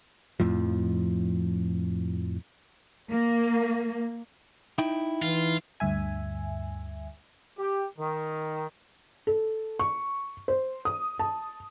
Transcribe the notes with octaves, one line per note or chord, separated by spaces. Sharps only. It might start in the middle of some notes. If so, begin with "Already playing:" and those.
F2 A2 F3
A#3
D#4 E4 G5
E3 F4
D2 G2 E5 G#5
G4
D#3
A4
C#6
C5
D#6
A5